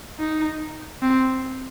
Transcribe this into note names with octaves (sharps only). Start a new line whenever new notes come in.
D#4
C4